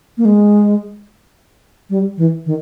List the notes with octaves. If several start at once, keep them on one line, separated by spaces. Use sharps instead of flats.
A#3
G#3
G3
E3
D#3